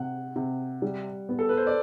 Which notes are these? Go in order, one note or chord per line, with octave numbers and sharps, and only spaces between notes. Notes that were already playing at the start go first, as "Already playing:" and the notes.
Already playing: C3 F#5
C3
G3
B3
A4
B4
C5
D5